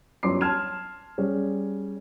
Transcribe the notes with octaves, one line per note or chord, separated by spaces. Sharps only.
G1 F#3 C#4 C6 D6 C7
A5 C6 F6 G#6 E7
G3 C#4 G#4